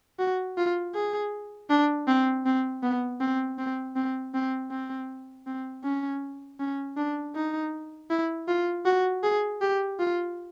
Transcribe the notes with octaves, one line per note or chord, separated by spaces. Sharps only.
F#4
F4
G#4
D4
C4
C4
B3
C4
C4
C4
C4
C4
C4
C#4
C#4
D4
D#4
E4
F4
F#4
G#4
G4
F4